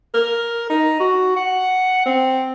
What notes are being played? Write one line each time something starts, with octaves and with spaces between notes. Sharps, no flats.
A#4
D#4
F#4
F#5
C4